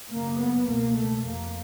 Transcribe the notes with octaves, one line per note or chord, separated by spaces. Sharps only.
F#2 C#3 A#3
B3
C#2 B2 A#3
A3
F2 C3 A#3